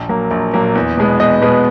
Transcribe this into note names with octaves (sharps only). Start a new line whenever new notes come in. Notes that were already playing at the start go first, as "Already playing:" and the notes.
Already playing: A#1
A#2 F#3 A#3
A#1
A#2 F#3 A#3
E2
B2 G#3 B3
E2 B4 D#5
B2 G#3 B3